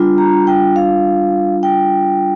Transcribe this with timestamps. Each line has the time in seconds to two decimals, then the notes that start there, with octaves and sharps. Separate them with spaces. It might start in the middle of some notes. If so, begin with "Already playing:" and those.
Already playing: G3 D4 F4
0.18 A#5
0.47 G5
0.76 F5
1.63 G5